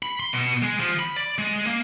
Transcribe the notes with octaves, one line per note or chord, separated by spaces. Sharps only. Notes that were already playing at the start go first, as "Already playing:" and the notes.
B5
C6
B2
G#3
F3
B5
D5
G#3
A#3